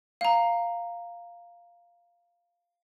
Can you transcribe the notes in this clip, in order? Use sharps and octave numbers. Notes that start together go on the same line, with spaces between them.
F5 A#5